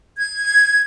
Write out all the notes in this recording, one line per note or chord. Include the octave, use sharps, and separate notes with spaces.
G#6